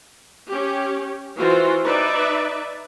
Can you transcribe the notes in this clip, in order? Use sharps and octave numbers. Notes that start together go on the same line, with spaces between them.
C#4 G4
E3 F4 F#4 C5
D#4 B4 D5 E5